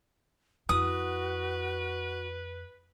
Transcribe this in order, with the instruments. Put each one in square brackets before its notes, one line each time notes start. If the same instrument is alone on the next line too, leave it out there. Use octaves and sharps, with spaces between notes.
[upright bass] F2 E4 [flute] F#4 [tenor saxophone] B4 [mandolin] D#6